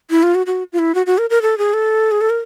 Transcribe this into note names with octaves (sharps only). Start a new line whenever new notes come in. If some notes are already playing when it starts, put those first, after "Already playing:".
E4
F4
F#4
F#4
F4
E4
F#4
F#4
A#4
A#4
A4
G#4
A4
G#4
A4
A#4